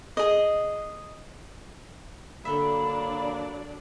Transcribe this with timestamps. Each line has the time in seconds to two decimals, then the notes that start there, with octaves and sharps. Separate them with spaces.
0.17 G#4 D#5
2.45 D3 F#3 A#3 D4 D5 E5 B5